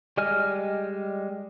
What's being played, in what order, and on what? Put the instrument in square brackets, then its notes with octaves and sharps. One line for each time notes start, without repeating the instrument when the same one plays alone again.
[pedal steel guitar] G3 G#3 D#5 G#5 F6